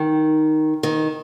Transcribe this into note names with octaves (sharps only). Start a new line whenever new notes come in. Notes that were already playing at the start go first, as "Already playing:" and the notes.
Already playing: D#3
D#3